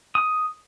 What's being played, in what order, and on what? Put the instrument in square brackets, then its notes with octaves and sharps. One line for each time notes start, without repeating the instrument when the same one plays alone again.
[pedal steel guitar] D#6